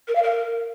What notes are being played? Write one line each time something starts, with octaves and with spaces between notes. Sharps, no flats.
A#4
F5
A#4